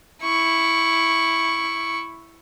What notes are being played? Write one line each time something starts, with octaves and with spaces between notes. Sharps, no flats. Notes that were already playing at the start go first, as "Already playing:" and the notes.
E4 C#6